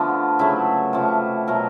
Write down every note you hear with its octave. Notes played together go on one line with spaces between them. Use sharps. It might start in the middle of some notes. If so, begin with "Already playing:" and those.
Already playing: D3 F3 A3 B3
C#3 F#3 A3 E4
C3 F3 A3
B2 F#3 A3 A#4